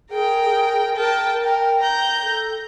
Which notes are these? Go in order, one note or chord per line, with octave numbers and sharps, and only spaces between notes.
G#4 A#4 G5
G#4
A#4 G5 A5
A#4 G5
A#5 G6
A4